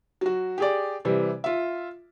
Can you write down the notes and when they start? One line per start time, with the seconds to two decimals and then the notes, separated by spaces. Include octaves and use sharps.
0.21 F#3 F#4
0.58 G4 G#4 D5
1.05 C3 E3 G3
1.44 F4 E5